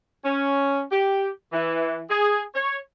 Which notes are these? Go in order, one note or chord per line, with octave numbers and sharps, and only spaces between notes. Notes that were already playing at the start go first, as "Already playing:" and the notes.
C#4
G4
E3
G#4
C#5